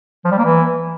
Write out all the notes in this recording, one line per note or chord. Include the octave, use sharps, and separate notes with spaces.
F3
G3
A#3
E3